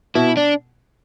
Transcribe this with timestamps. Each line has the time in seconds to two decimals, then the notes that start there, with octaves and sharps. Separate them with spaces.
0.15 B2 E4
0.37 D4